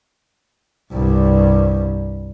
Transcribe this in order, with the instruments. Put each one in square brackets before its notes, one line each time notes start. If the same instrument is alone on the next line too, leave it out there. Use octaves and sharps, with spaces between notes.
[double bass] C2 G2